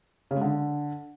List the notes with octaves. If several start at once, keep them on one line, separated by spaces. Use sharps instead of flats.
C#3
G#3
D3